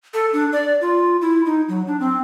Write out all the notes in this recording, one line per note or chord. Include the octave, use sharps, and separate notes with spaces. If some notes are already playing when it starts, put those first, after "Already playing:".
A4
D4
D5
F4
E4
D#4
F#3
D4
C4